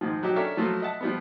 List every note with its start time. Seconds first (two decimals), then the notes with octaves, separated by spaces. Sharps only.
0.01 G#2 D#3 F3
0.23 F#3 D#4 G4
0.36 C#4 D4 A4 A#4 C#5 E5
0.57 F3 F#3 A3 A#3 F4
0.82 D#5 E5 F#5 A5
1.01 F3 G3 B3